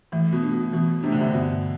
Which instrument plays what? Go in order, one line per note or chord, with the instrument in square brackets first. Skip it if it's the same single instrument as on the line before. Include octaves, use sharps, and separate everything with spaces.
[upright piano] A2 [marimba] E3
[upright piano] B2
[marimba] A3 D4
[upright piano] B2
[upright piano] B2 [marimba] E3
[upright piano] C3 [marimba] A3 D4
[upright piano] D3
A2 C3
[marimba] G2 [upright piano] B2 D3